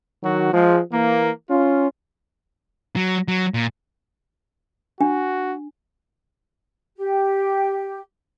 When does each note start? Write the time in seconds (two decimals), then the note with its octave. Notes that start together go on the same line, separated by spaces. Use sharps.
0.23 D#3 F#3 F#4
0.54 F3 G#3
0.92 E3 A#3
1.50 C#4 F4
2.96 F#3
3.28 F#3
3.54 A#2
5.01 D4 F#4
6.98 G4